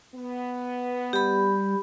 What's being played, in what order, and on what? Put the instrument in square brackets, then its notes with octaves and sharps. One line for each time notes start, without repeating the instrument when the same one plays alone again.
[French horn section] B3
[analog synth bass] G3 [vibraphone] G4 B5